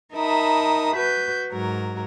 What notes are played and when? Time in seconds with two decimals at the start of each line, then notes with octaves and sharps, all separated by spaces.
0.14 D#4 A#4 E5 A5 B5 D#6
0.95 F#4 B4 G6
1.52 G#2 F#3 A#4